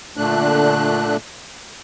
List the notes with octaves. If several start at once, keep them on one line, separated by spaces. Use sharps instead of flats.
A#2 D3 A3 D4 F#6